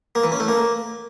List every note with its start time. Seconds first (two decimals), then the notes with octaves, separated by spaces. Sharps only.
0.15 A#3
0.24 E3
0.32 C#4
0.40 A3
0.48 A#3